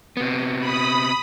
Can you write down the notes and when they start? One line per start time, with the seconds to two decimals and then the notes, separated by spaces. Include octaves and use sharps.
0.17 C3 B3
0.60 B5 D#6